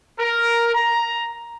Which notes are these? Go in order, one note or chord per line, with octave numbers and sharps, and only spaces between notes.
A#4
A#5